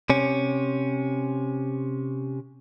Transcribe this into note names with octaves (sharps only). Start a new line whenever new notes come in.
C3 C#4